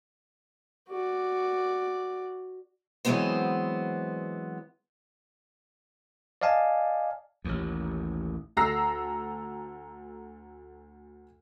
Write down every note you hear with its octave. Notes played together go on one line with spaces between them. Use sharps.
F#4 D5
E3 F#3 G#3 B3 C4 C5
D5 D#5 F5 G#5 A5
A1 D#2
D2 A4 A#5 E6 A#6 C7